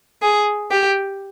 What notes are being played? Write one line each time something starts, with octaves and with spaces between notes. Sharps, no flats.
G#4
G4